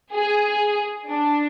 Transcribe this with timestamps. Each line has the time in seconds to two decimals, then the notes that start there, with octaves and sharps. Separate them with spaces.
0.13 G#4
1.07 D4